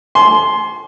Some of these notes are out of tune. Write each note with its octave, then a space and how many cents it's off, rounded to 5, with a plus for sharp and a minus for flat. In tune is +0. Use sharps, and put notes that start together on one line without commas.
G#5 +45 C6 +0